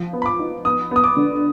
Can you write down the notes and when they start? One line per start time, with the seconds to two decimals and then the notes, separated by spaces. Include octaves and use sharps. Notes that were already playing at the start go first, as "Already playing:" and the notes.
Already playing: F3
0.13 B3
0.22 B5
0.26 D6
0.39 D#4
0.65 B3 D#6
0.91 B3 D#6
1.04 D6
1.17 D3